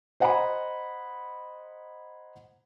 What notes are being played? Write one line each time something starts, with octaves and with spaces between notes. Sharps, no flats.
C5 D#5 F#5 G#5 A#5 B5